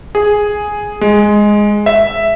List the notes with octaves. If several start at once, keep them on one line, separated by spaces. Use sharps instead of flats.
G#4
G#3
E5